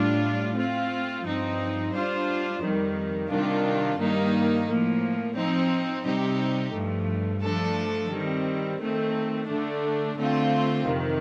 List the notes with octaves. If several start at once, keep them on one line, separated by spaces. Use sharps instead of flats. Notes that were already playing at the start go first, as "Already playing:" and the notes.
Already playing: A2 G3 D4 F4
A3 C4 F4
G2 F3 C4 D#4
G3 D4 F4 C5
F2 D#3 G3
C3 D#3 G3 D4 F4
G2 D#3 G3 A#3 D#4
A2 F3 A#3
F3 C4 D#4
C3 G3 C4 D#4 G4
G2 F3 A3
F3 A3 D4 A4
D#3 G3 C4
D#3 A3 C4
D3 A3 D4
D3 A3 C4 F4
F2 C3 D#3